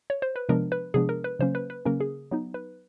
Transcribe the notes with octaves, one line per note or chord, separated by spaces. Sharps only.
C#5
C5
B4
C3 F3 G#3 B3 D4 A#4
B4
C3 F3 G#3 B3 D4 G#4
A#4
B4
C#3 F#3 A#3 C#4 C5
B4
B4
C#3 F#3 A#3 C#4 A#4
G#4
F#3 B3 D#4
B4